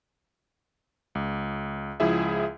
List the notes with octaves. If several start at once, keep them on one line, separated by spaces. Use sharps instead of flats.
C#2
C#2 F3 E4 G#4 E5